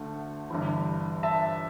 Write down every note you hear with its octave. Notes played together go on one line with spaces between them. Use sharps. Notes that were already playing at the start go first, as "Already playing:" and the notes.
Already playing: D2 D3 A3
G1 G2 E3
E5 A5